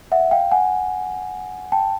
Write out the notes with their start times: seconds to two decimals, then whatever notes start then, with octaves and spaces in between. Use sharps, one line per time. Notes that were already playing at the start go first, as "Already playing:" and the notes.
0.12 E5 F#5
0.31 F5 G5
0.51 F#5 G#5
1.72 G5 A5